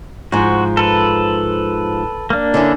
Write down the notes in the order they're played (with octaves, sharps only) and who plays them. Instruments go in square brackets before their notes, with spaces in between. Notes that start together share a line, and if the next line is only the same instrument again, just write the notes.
[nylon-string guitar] G#2 F3 [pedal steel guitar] F#4
[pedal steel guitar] A4 B4
A#3 D4
[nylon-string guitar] D3 C#4 E4